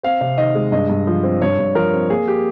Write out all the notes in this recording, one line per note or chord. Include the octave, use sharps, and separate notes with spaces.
C4 F5
C3
D#3 D#5
G#3
G2 D#5
G2
F3
C4
G2 C#5
G2
F3 A#4
C4
A#3 G#4
G4